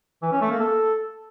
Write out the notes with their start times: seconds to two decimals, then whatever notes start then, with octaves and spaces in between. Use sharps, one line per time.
0.22 E3
0.32 C#4
0.41 A3
0.51 A#3
0.60 A4